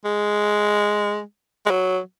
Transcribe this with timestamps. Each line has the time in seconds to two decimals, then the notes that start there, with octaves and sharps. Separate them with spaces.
0.05 G#3
1.66 G#3
1.70 F#3